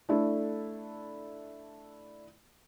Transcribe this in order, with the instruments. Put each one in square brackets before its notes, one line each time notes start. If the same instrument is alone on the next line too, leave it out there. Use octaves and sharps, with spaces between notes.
[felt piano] A3 D4 E4 A4